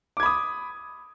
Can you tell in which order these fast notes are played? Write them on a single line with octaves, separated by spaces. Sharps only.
D6 G#6 B5 D#6